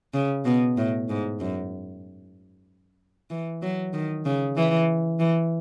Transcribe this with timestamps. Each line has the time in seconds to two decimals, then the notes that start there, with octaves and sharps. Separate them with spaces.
0.14 C#3
0.45 B2
0.77 A2
1.09 G#2
1.40 F#2
3.30 E3
3.62 F#3
3.93 D#3
4.25 C#3
4.56 E3
5.19 E3